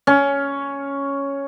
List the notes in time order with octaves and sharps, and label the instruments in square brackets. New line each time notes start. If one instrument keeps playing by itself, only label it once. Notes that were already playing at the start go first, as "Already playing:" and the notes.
[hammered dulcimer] C#4